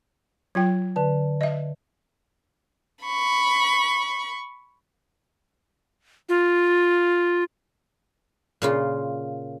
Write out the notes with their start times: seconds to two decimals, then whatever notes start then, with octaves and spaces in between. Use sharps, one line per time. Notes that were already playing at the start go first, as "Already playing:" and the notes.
0.55 F#3 F4 G5 G#6
0.96 D3 B4 A5
1.41 D#5 E5
3.04 B5 C#6
6.29 F4
8.62 A#2 C#3 F4